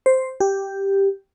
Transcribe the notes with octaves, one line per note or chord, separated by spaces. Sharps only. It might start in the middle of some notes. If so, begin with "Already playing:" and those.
C5
G4